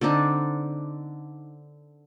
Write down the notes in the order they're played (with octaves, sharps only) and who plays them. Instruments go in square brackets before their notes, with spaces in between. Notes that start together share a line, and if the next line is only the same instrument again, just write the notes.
[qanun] D3 C4 D4 D#4